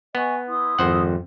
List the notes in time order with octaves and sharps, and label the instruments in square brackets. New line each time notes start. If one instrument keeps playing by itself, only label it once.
[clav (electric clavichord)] B3 [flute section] D#5 G#5 C#6
[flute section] E4 C6 D#6
[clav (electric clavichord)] G#1 C5 F#5 [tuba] F2